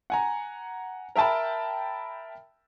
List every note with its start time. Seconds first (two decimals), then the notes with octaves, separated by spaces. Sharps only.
0.10 F#5 G#5 A#5
1.16 A#4 E5 G5 A5 B5